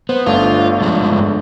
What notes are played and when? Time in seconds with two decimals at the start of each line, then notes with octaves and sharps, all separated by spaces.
0.09 B3 C5
0.26 G1 A3 D4 F4
0.81 G2 F3 G#3